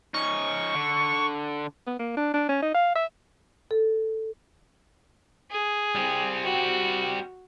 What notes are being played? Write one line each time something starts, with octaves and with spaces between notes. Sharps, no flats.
C#4 D#4 C#6
D3
B3
A#3
D4
D4
C#4
D#4
F5
E5
A4
G#4
G3 C4
F#4